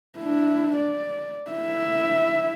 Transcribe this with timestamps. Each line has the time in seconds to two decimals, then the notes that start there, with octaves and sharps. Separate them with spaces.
0.19 D4 E4
0.76 D5
1.51 E4 E5